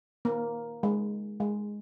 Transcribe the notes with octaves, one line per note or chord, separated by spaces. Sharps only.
A#3
G#3
G#3